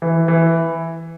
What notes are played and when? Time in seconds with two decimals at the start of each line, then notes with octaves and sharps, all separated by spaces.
0.02 E3
0.28 E3